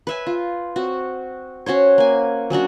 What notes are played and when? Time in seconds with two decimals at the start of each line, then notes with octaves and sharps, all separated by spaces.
0.07 B4 E5 G#5
0.27 F4
0.76 C4 F#4
1.66 C#4 F#4 C5 C#5
1.98 A#3 G#5
2.50 F#3 C#4 D4 F#4